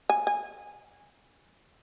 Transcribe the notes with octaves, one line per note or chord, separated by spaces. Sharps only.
G#5
G#5